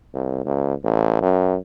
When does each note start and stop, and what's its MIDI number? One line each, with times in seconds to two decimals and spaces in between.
0.14 0.42 36
0.45 0.74 37
0.84 1.20 33
1.22 1.57 42